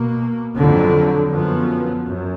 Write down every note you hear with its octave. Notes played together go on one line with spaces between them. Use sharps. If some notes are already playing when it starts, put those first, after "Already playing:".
Already playing: B2 A#3
F2 D3 F#3
F#2 F3 B3
F#2